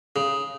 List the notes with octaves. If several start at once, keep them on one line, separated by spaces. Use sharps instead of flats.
C#3